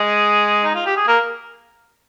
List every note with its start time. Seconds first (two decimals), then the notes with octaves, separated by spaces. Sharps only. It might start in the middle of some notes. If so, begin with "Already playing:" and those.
Already playing: G#3 G#4
0.64 D#4
0.74 F4
0.86 G4
0.96 G#4
1.08 A#3 A#4